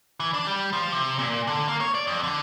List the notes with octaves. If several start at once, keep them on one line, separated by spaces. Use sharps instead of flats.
E3
D4
G3
F3
C3
A#2
D3
A#3
C#5
D5
F2
D3